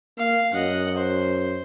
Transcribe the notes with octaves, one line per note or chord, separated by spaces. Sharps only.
A#3 F5
F#2 D#5 F#5
C5